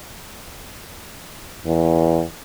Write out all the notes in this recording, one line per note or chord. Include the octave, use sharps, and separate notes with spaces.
E2